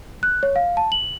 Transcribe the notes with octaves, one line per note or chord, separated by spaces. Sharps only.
F#6
C#5
F5
A5
F#7